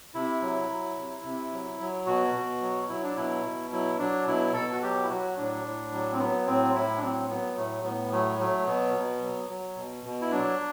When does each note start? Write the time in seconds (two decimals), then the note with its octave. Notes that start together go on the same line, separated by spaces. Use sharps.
0.14 C3 E4
0.42 F#3
0.70 F#3
0.97 C3
1.24 C3
1.52 F#3
1.80 F#3
2.06 B2 F#4
2.34 B2
2.61 F#3
2.89 F#3 E4
3.03 D4
3.16 B2 E4
3.44 B2
3.72 F#3 E4
3.99 F#3 D4
4.27 B2 E4
4.54 B2 A4
4.72 F#4
4.82 F#3 G4
5.04 E4
5.09 F#3 F#4
5.37 A2 D4
5.64 A2
5.92 F#3
6.13 C4
6.19 F#3 B3
6.47 A2 C4
6.74 A2 E4
6.97 D4
7.01 F#3 C4
7.29 F#3 B3
7.56 A2 A3
7.84 A2 B3
8.12 F#3 A3
8.39 F#3 A3
8.66 B2 B3
8.94 B2
9.22 F#3
9.49 F#3
9.76 B2
10.04 B2
10.21 E4
10.31 F#3 D4